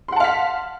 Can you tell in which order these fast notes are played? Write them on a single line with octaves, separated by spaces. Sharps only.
C6 F#5 A5 F5 B6